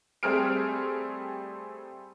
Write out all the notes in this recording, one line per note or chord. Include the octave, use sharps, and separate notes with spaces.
G3 A3 C4 G#4 F6 D7